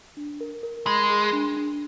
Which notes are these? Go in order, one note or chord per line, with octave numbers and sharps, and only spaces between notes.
D4
A#4
A#4
G#3 B5
G#4
D4
D4